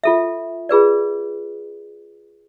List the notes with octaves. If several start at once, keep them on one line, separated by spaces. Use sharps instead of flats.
F4 A4 E5
F4 G#4 B4 D5